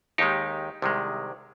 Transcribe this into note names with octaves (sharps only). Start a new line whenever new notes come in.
D#2 D#3 G#3 D#4 G4
C2 C3 D#3 G#3